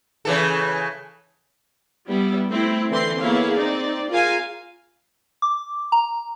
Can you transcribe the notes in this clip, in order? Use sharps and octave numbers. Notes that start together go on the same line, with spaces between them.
C#3 E3 A4
G3 B3 E4
A3 C4 E4
D3 E3 A3 C4 C6
A#3 B3 E4 G#4 C#5 F5
C4 D#4 D5
F4 G#4 A#4 F5 G#5
D6
A#5